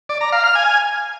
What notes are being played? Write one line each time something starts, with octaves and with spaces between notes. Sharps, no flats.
D5
A#5
F5
F6
G#5